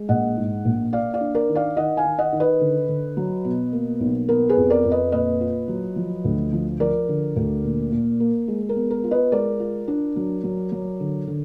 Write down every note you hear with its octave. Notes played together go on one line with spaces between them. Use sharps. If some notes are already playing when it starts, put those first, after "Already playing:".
Already playing: G#3
A#1 D#5 F#5
G#2
A#1
A#3 D5 F5
D5 F5
D4
A#4 D5
D#3
D5 F5
D#3 D#5 F#5
F5 G#5
D#3
D#5 F#5
D#3
B4 D#5
D3
D3
F#3
B2
A#3
B1
B3 A#4
G#4 B4
F2
A#4 D5
F2
B4 D#5
A#2 B4 D#5
F4
F#3
F3
D2
F3
F3 A#4 D5
D3
D2
A#2
A#2
A#3
G#3
A#4
B3
A#4
F4
B4 D#5
G#3 A#4 D5
F4
D4
F#3
F#3
F#3
D3
D3